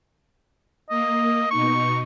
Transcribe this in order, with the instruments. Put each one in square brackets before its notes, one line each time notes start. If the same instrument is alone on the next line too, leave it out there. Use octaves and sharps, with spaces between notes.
[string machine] A#3 [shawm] D#5
[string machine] B2 D#4 [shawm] C#6